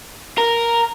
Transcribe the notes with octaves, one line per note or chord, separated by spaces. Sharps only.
A#4